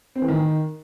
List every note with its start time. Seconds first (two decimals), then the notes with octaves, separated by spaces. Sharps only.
0.16 C4
0.22 E3
0.28 D#3